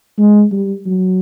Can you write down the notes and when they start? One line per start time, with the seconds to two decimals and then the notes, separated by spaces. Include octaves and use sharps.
0.18 G#3
0.52 G3
0.86 F#3